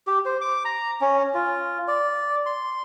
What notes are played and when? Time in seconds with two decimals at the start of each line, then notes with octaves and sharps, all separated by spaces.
0.07 G4
0.26 C5
0.41 D6
0.65 A#5
1.01 C#4
1.34 F4
1.88 D5
2.46 C6